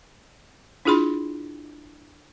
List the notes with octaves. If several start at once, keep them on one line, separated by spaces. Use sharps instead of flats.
D4 E4 F4 G#4 B5 C6